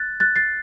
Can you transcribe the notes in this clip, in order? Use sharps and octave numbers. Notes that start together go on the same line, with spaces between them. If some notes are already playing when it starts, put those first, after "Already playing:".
Already playing: F#6 A6
F#6 A6
A6 C7